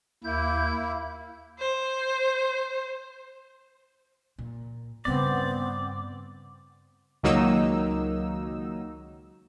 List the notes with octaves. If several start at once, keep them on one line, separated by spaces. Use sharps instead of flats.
D#2 A#3 E4 G6
C5
A#2
G2 C#3 B3 C4 D5
C#2 D#3 F#3 A#3 D#4 E6